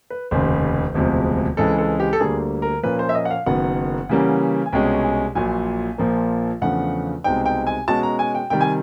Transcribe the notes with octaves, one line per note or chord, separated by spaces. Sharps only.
B4
F1 D#2 C#3 C5
E1 D2 C3 F3 G#3
C#2 C#3 E3 G#3 C4 A4
A4
G4
A4
D2 D3 G3 A#3 G#4
A#4
A#2 F3 A#3 C#4 B4
C5
E5
D#5
F#5
F5
F#1 F#2 D#3 F#3 B3 F#5
C#3 E3 G3 A#3 C#4
G#5
C2 B2 G#3 C#4 G5
G#5
A#1 A#2 F#3 G#5
A#1 A#2 F3 A#3
E2 C#3 F3 A3 D4 F#5
C2 B2 G#3 C4 D#4 G5
G5
G#5
B2 G#3 C#4 F#4 A5
A#5
G#5
G5
C3 D#3 G3 G5
G#5